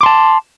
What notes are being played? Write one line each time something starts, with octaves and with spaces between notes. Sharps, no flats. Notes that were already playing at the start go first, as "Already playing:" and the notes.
A5 C6 D6